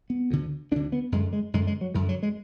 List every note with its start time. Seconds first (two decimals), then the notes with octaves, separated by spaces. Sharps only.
0.10 B3
0.30 D2 D3
0.71 D2 D4
0.76 D3
0.92 B3
1.12 F#2 D3 G#3
1.33 G#3
1.54 F#2 D3 G#3
1.67 G#3
1.81 F#3
1.94 F#2 D3 D#3
2.09 F#3
2.23 G#3